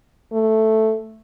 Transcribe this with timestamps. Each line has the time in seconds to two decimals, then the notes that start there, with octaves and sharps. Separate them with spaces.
0.32 A3